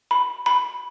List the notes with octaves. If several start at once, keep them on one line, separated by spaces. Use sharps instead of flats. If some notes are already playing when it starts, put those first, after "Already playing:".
B5
B5